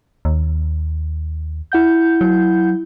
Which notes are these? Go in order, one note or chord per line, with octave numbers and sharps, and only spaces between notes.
D#2
E4 F#5 G6
F#3